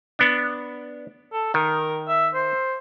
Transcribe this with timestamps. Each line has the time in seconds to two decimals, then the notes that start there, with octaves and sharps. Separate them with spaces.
0.19 B3 D4
1.33 A4
1.54 D#3 A#4
2.08 E5
2.34 C5